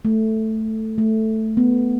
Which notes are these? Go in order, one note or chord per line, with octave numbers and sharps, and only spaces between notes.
A3
A3
B3